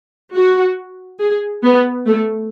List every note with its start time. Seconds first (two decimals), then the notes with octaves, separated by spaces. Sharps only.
0.35 F#4
1.20 G#4
1.63 B3
2.07 A3